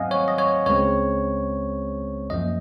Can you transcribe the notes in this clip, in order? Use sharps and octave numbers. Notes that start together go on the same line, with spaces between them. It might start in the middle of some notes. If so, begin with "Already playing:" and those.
Already playing: G#2 F#3 C4 D#5 F5 F#5 G#5
C#5
D#5
C#5
C#2 C#3 G#3 C4 C#5
F#2 F3 A#3 D#5